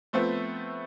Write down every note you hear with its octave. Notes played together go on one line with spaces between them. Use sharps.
F3 A3 B3 C4 E5